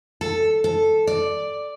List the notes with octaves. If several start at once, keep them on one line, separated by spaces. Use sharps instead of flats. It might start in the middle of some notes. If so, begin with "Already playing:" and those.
A4
A4
D5